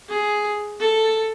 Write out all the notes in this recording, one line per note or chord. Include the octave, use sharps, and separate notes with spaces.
G#4
A4